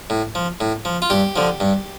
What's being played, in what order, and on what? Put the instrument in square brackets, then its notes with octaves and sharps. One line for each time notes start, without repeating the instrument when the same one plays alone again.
[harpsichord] A2
F3
A2
F3
F4
G2 G4
D3 F3
G2